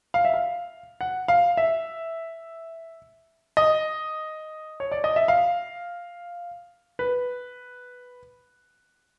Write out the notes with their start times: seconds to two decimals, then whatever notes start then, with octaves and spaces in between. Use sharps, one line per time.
0.14 F5
0.25 E5
0.34 F5
1.01 F#5
1.28 F5
1.57 E5
3.57 D#5
4.80 C#5
4.92 D5
5.04 D#5
5.16 E5
5.28 F5
6.99 B4